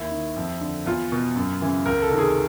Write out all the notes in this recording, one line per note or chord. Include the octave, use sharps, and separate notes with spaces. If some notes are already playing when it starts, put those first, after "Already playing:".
Already playing: D#2 E4
D#3
F2
D3
E2 F4
B2
F#2
C#3 E3
C#2 A#4
A4
C3 D#3
G#4